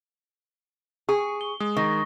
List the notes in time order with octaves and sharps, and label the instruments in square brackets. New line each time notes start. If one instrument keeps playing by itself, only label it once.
[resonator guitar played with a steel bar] G#4 [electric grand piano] C#6
[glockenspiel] G7
[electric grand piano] G#3 [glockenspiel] D#6
[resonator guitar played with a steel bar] D#3 [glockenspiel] C#6 A#6